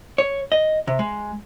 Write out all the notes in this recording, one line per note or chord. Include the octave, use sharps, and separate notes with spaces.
C#5
D#5
C3
G#3